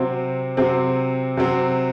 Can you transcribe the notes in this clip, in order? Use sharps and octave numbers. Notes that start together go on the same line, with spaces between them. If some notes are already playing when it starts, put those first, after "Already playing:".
Already playing: C3 F#3 C4
C3 F#3 C4
C3 F#3 C4